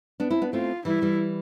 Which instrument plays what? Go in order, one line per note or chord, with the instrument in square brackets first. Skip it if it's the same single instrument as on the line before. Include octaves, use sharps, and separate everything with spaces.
[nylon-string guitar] B3 D4
C4 E4
B3 D4
[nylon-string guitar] A3 C4 [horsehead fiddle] F4
[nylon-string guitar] E3 G3 [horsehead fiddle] E4
[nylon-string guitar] E3 G3